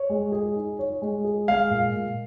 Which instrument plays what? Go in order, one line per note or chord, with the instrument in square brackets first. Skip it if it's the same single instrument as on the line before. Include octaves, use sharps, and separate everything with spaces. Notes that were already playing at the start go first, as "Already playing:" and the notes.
Already playing: [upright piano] C#5
G#3
G#4
D#4
C#5
G#3
G#4
[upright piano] G#3 [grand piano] F5
[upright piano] A#2
A#2